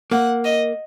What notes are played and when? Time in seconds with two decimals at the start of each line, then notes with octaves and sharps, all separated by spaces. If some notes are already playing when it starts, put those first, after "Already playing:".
0.11 A#3 F#5
0.45 D#5